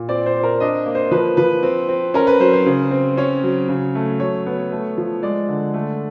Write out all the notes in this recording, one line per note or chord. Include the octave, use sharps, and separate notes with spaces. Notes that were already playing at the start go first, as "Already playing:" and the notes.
Already playing: A#2
C4 D5
C5
C4
A#4
D4 D#5
A#3
C5
F3 B4
F3 B4
C4
C4
C#4 A#4
B4
F#3 C5
C5
C#3
C4
C#4 C#5
F#3
C#3
A3
F#3 C#5
B3
A3
F3
G#3 D5
D3
A3